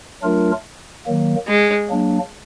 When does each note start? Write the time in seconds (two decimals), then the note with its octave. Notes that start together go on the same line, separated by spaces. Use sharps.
0.22 F#3 A3 D4 F4 A#4
1.06 D#3 F#3 A#3
1.48 G#3
1.90 F#3 A#3 D4